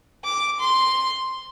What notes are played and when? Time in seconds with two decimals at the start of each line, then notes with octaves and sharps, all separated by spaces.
0.25 D6
0.60 C6